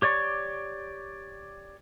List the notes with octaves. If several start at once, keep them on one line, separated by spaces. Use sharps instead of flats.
G4 C#5 D5 C#6